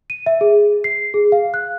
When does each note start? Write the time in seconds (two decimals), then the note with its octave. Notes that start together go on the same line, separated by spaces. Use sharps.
0.10 D#7
0.26 E5
0.41 G#4
0.84 C7
1.14 G#4
1.32 F5
1.54 F#6